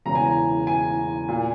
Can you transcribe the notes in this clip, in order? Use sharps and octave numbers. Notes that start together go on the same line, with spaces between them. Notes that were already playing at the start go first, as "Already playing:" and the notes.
E1 E2 C#3 A#5
G#5
A#5
G#5
A#2